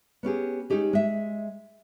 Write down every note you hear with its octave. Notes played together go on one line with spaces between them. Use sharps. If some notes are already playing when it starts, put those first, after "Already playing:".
B3 C#4 G4 G#4
G#3 C#4 D#4 G4 G#4
G#3 E5